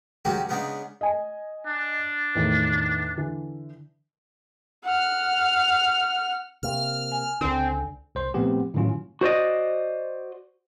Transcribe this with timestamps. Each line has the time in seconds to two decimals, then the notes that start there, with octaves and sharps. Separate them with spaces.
0.25 D#3 F#3 G#3 C#4 F#4 G4
0.49 C#3 G#3 B3 D4 D#4
1.01 D#5 G#5
1.66 D4
2.35 E2 A2 D#3
3.17 D3 E3
4.84 F#5 F6
6.63 C3 A#3 F6
7.12 G#5
7.41 C#2 D3 C4
8.15 C2 C5 C6
8.34 A#2 F3 A3 B3 C4 G4
8.74 A2 D3 D#3 F#3 C#4 F4
9.21 F#4 C5 D5 D#5